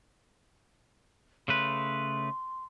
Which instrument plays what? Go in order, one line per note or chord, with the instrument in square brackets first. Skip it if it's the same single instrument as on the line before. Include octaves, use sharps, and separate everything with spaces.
[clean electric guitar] C#3 A3 B4 [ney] C6